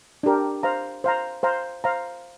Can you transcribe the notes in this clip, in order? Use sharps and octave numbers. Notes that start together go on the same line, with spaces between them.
D4 G4 A#4
C5 F5 A#5
C5 F5 A#5
C5 F5 A#5
C5 F5 A#5